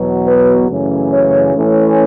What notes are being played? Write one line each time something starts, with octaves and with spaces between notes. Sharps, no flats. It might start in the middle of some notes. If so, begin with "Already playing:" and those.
Already playing: E2 B2 F#3 B3
B4
F#2 C#3 E3 A3 C#4
C#5
A2 E3 A3 C#4